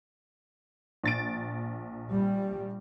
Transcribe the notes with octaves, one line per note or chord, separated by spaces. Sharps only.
A#1 A6 D7
G3